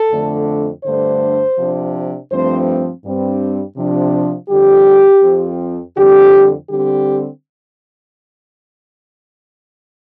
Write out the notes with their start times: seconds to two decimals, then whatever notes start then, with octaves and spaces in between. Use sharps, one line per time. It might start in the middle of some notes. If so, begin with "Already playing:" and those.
Already playing: A4
0.11 F2 D3 A3 D4
0.84 G2 D3 A3 D4 C5
1.58 C3 F3 D4
2.30 G2 F3 A3 C4 C5
3.05 G2 G3 C4
3.77 C3 F3 D4
4.50 F2 D3 G3 G4
5.23 F2 F3 C4
5.97 F2 D3 G3 C4 G4
6.69 D3 G3 C4 G4